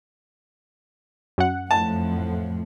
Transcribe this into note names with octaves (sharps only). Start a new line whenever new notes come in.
F#2 F#5
F2 A2 F3 A5